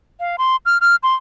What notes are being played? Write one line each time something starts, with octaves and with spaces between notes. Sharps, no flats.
F5
C6
F6
F6
C6